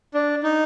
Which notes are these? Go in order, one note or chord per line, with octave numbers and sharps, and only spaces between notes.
D4
D#4